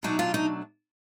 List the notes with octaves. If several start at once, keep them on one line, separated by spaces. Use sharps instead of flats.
B2 F#3 A3 D4 D#4
F4
D#4